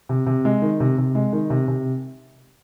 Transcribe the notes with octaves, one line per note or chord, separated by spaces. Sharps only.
C3
C3
G#3
D#3
C3
C3
G#3
D#3
C3
C3